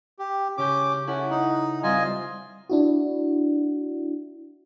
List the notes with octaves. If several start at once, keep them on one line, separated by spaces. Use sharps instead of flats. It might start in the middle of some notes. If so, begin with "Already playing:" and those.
G4
C#3 C#4 G4 D6 G6
C#4 E4 A4 F#5
D#4 F#6
G3 C4 F4 C5 D#5 G#5
D4 E4 F#4